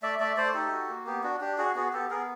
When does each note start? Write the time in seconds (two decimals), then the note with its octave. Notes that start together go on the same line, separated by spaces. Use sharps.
0.02 A3 D5 E5
0.20 A3 D5 E5
0.37 A3 C5 D5
0.54 D#4 G4 A4
0.72 F#4
0.90 A#3
1.07 B3 G4
1.23 D4 F#4
1.41 D4 G4
1.58 F#4 G#4
1.75 B3 F#4 G#4
1.93 B3 G4 A4
2.10 B3 G#4 A#4